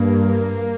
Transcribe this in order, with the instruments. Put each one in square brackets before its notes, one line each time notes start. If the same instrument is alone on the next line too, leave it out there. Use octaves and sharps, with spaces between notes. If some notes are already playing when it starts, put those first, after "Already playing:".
Already playing: [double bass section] G2 A#3